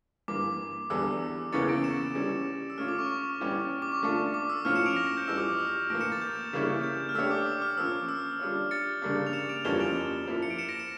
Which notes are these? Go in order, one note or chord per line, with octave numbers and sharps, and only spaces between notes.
G2 E3 A#3 D6
E2 E3 G3 D4 A4 E6
E2 C#3 E3 A#3 C#4 A6 C#7
A#6 D7
C#7 E7
E3 G3 C#4
E6
A3 C#4 F4 F6
D6
C#6
C#6
E3 G3 C#4 G4
D6
C#6
A3 D4 F4 A4
D6
E6
A2 F3 C#4 F4 C#5 F6
C#7 E7
D7 F7
A#6 D7
A#6
G6
F2 E3 G3 E6
D6
D6
E6
A2 E3 A#3 A#6 D7
C#7 E7
A6
G6
C#3 G3 A#3 C#4 E4
G6
F6
A3 D4 G4 C#5 E6
D6
D6
F6
F3 A#3 C#4 E6
E6
G3 D4 F4 C#5
A6 C#7
C#3 G3 A#3 D4
F7
C#7 E7
D7 F7
F2 E3 G3 A#3 C#4 E7 G7
D7 F7
F3 A#3 E4
C#7
D7
C#7 E7
A#6 D7
C#7 E7